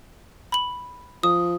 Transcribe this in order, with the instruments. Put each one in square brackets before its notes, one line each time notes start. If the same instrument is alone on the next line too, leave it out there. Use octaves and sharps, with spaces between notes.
[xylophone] B5 F#7
[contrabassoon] F3 [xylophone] D#6